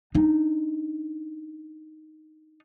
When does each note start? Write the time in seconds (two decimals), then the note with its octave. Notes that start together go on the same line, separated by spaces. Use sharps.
0.15 D4 D#4